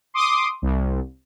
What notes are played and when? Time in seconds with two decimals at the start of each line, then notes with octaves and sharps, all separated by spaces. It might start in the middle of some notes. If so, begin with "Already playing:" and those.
0.14 C6 D6 D#6
0.62 C2